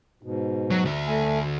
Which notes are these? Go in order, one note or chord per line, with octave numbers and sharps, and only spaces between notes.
G#2 B2
F#3
D2 E5
A3 G#5